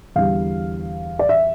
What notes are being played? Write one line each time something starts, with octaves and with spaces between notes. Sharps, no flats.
E2 D3 G3 F5
D5
E5